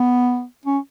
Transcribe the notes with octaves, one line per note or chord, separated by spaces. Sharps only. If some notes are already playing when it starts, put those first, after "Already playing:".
Already playing: B3
C#4